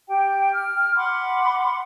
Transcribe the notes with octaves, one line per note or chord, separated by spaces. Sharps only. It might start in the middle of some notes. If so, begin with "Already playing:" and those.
G4 G5
F6
F#5 B5 C6 D6